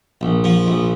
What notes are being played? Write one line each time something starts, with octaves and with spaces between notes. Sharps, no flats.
A#1
F3
A#1